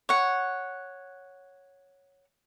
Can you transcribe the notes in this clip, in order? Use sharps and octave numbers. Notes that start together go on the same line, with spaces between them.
C#5 F#5